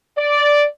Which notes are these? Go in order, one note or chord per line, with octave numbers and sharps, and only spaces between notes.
D5